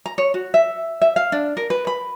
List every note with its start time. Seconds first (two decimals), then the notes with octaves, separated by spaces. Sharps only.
0.06 A#5
0.18 C#5
0.34 F#4
0.54 E5
1.02 E5
1.16 F5
1.32 D4
1.57 A#4
1.70 B4
1.87 B5